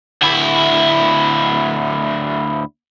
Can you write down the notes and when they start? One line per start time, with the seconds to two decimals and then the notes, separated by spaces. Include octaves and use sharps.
0.22 D2 E4